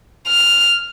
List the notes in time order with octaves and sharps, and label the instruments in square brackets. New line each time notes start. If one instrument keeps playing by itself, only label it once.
[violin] F6